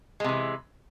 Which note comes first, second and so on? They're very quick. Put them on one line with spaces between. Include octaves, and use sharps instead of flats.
G#3 C3 E3